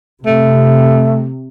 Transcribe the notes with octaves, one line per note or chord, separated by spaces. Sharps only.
C3 A3